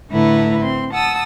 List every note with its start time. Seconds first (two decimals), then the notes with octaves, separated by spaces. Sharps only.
0.11 A2 D3 A3 E4 B4 A#5
0.60 C4 C6
0.91 F#5 A5 D#6 E6